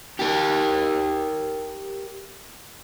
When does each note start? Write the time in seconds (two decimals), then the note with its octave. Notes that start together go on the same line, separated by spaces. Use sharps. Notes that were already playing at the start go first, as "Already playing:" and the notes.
0.19 G4 A#4